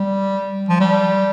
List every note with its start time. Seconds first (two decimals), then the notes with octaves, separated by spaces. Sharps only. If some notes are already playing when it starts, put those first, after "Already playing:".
Already playing: G3
0.69 F3
0.80 G3